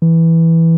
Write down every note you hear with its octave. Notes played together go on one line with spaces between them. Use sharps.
E3